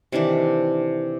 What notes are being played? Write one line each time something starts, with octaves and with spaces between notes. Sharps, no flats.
C3 D#3 E3 D4